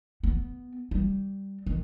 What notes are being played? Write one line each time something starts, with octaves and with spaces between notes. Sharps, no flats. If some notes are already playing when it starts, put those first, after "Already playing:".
B3
G3
D#3